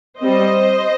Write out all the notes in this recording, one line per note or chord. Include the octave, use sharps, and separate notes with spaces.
G3 C4 C5 D#5